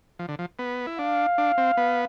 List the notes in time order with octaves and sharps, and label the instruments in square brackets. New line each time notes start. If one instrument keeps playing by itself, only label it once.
[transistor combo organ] F3
D3
F3
B3
E4
[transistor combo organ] D4 [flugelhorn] F5
[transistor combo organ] D4
C4
B3